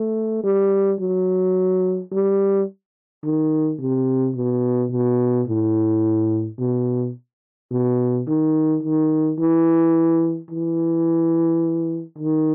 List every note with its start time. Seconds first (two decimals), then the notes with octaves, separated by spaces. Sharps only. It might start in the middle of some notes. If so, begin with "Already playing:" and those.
Already playing: A3
0.44 G3
1.00 F#3
2.12 G3
3.24 D#3
3.80 C3
4.36 B2
4.92 B2
5.48 A2
6.59 B2
7.71 B2
8.27 D#3
8.83 D#3
9.39 E3
10.51 E3
12.19 D#3